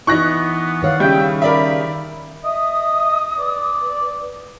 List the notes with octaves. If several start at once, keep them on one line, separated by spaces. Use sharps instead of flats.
E3 B3 D#4 E4 C#6 F#6 A#6
D#3 C#5 D5 F5 F#5
C#3 G3 E5 G5
A#4 D5 E5 B5
D#5 E5 D#6
B4 D5